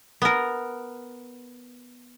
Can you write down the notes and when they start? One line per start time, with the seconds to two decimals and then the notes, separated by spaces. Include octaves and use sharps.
0.22 B3 A#4